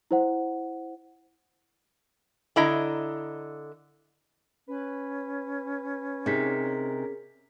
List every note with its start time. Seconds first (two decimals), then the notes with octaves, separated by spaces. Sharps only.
0.11 E4 C5 F#5
2.56 D3 E4 D#5 A#5
4.68 C#4 B4
6.26 C3 D#4 G#4 A#4 B6